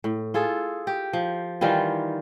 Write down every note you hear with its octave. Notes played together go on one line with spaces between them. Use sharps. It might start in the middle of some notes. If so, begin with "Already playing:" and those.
A2
F4 G#4 A4
G4
F3
D#3 E3 G3 F4